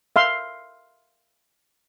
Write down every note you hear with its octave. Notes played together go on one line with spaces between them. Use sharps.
E5 F5 C6